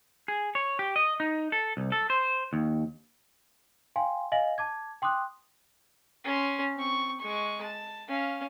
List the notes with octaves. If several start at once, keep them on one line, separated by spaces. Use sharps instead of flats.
G#4
C#5
G4
D#5
D#4
A4
C2
A4
C5
D#2
F5 G5 G#5 C6
D#5 F5 G#5 A#6 F#7
A5 D6 G#6
G5 C6 D6 D#6 F#6
C#4 C6
C4 C#6
G#3 C#6
A5
C#4 F5